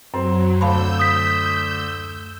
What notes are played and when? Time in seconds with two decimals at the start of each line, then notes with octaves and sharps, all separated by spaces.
0.14 F#2 F#3 C4
0.61 D2 F5 A5 B5 E6 G6
0.99 D#6 B6